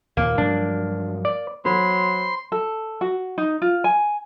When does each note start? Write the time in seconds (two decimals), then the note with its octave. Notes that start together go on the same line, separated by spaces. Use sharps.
0.17 D#2 A#2 A#3
0.38 G2 F3 F#3 D4
1.25 D5
1.65 F#3 C5 B5 C6
2.52 A4
3.01 F#4
3.38 D#4
3.62 F4
3.84 G#5